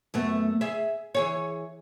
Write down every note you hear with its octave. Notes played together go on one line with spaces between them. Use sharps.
F#2 A3 B3
G#4 E5
E3 G#4 C#5